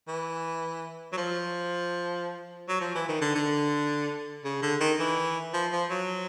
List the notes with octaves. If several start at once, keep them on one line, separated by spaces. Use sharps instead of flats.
E3
F#3
F3
F#3
F3
E3
D#3
D3
D3
C#3
D3
D#3
E3
F3
F3
F#3